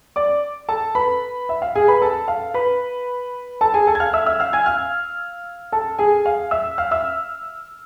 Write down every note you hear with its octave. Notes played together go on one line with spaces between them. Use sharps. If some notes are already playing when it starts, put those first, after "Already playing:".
D5 D6
A4 A5
B4 B5
E5
F5
G#4 G#5
B4 B5
A4 A5
F5
B4 B5
A4 A5
G#4 G#5
A4 A5
G#6
F5 F6
E5 E6
E5 E6
F5 F6
G#5 G#6
F5 F6
A4 A5
G#4 G#5
F5
E5 E6
F5 F6
E5 E6